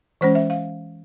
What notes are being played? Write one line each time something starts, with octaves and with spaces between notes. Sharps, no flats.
E3 G#3 C#4 C5
E5
F5